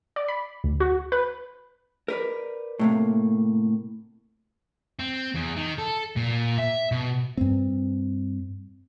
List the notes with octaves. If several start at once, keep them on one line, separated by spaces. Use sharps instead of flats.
D5
B5
D2
F#4
B4
A#4 B4 D5
A2 C3 A#3
C4
E2
D#3
A4
A#2
E5
B2
G2 C4